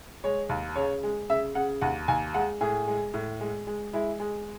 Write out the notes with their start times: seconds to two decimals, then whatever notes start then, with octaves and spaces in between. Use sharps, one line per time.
0.24 G#3 C#5
0.49 D#2
0.76 C#3 C#5
1.03 G#3
1.30 C#3 E5
1.55 C#3 F#5
1.81 D#2 F#5
2.08 D#2 G#5
2.34 G#3 F#5
2.61 A2 G#4
2.88 G#3
3.14 A2
3.40 G#3
3.67 G#3
3.93 G#3 E4
4.20 G#3